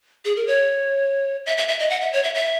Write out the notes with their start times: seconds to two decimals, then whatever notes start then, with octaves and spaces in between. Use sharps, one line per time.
0.25 G#4
0.36 A#4
0.47 C#5
1.46 E5
1.58 E5
1.68 E5
1.79 D#5
1.90 F#5
2.01 E5
2.13 C#5
2.23 E5
2.35 E5